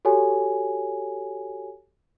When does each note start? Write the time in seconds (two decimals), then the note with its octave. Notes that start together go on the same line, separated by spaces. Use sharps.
0.05 F#4 G4 A4 C#5 G#5